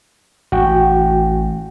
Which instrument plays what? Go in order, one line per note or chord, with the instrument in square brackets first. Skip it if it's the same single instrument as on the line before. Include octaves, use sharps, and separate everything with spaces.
[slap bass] A1 [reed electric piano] F#4 G5